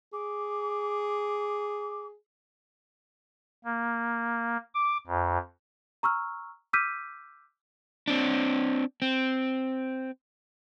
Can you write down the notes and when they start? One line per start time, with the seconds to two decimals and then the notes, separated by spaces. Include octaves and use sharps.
0.13 G#4 D6
3.65 A#3
4.75 D6
5.07 F2
6.03 A#5 C#6 E6 F6
6.73 D6 E6 F6 G6 B6 D#7
8.08 C4 D4
9.02 C4